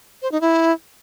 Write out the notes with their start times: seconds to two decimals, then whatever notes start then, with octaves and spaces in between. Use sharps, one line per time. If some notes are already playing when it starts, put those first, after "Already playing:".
0.22 C5
0.32 D#4
0.41 E4